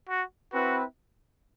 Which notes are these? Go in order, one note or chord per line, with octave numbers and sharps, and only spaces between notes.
F#4
C4 E4 F#4 B4